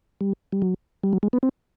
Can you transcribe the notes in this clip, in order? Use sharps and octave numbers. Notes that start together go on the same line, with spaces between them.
G3
G3
F#3
G3
F#3
G#3
B3
C4